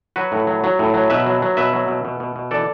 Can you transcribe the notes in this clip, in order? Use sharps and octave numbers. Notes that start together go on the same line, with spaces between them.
F#3 F#4 B4
A2
F#3
F#3
A2
F#3
B2 B4 E5
F#3
F#3
B2 B4 E5
F#3
B2
B2
B2
B2
E3 A4 D5